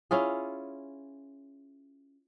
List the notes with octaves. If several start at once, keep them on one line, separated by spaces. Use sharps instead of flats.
C#4 E4 F4 G#4